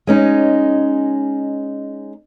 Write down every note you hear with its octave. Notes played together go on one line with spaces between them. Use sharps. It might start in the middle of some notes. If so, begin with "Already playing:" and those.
G#3 C#4 D#4